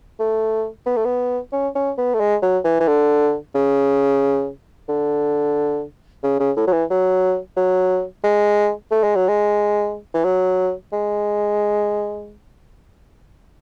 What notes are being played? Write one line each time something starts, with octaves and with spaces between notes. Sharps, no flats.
A3
B3
A3
B3
C#4
C#4
B3
A3
G#3
F#3
E3
E3
D3
C#3
D3
C#3
C#3
A2
F#3
E3
F#3
F#3
G#3
A3
G#3
F#3
G#3
E3
F#3
G#3